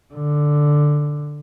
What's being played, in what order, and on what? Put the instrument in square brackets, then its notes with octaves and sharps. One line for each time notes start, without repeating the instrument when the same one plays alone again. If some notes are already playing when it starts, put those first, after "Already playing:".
[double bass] D3